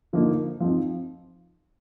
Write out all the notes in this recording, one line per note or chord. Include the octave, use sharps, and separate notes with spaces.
D3 F3 A#3 D#4
F3 C4 D#4